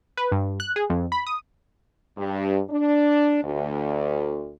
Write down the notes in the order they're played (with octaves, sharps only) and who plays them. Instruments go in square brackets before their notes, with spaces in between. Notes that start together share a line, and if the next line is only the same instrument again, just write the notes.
[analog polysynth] B4
G2
F#6
G#4
F2
B5
D#6
[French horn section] G2
D4
D2